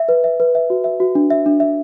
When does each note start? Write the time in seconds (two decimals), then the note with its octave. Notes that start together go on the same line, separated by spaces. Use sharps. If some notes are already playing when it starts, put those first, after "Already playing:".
Already playing: E5
0.09 B4
0.24 E5
0.40 B4
0.55 E5
0.70 F#4
0.84 E5
1.00 F#4
1.15 D4
1.30 E5
1.46 D4
1.60 E5